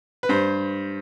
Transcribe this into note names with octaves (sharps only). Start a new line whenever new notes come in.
B4
G2 C5